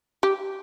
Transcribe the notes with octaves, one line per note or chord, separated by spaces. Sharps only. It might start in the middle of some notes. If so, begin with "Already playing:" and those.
G4